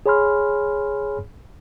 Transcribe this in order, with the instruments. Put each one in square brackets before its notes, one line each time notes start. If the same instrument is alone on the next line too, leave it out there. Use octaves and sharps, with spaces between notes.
[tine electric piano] G#4 C#5 G#5 B5 C6 F6